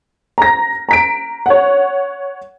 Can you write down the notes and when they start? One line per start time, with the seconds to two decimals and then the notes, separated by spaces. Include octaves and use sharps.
0.38 A#5 A#6
0.89 A#5 B6 D7
1.46 C#5 F#5